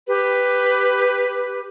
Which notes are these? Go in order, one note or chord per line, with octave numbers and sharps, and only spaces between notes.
G4 B4